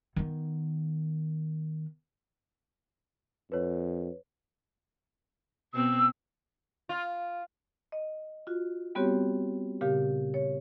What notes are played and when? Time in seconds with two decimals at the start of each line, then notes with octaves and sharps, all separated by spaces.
0.16 D#3 B3
3.52 F2 B4 C#5
5.74 B2 B3 C4 E6
6.89 F4
7.92 D#5
8.47 F4 F#4
8.95 G3 B3 C4 F#4 G4 C#5
9.81 A#2 C#3 G4 F5
10.34 C#5